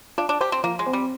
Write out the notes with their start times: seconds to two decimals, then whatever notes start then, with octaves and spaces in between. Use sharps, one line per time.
0.18 D4 F4
0.29 D4
0.41 G4 C5
0.52 C4
0.64 F3 A#3
0.79 G#3
0.86 C4
0.93 G3